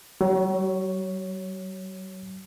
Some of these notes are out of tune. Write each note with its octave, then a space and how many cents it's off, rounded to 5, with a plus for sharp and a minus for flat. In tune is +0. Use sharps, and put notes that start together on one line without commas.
F#3 +45 C#5 +0